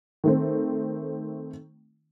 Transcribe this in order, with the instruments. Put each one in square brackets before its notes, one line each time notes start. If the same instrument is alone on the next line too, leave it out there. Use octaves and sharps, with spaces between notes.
[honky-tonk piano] D#3 A3 C4